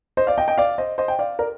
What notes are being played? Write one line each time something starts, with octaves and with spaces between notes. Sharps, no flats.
C5 D#5
D5 F5
D#5 G5
D#5 G5
D5 F5
C5 D#5
C5 D#5
G5
D5 F5
A#4 D5